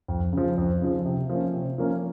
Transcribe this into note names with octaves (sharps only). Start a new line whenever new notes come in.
F2
C#3 F3
F2
C#3 F3
C3
F3 A#3 C#4
C3
F3 A#3 C#4